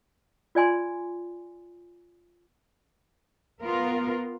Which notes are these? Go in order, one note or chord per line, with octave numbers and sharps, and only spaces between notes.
F4 D5 G#5 C6
B3 F4 A#4